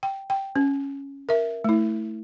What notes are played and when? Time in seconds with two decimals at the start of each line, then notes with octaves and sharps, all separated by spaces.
0.03 G5
0.30 G5
0.56 C#4
1.29 A#4 E5
1.64 A3 E4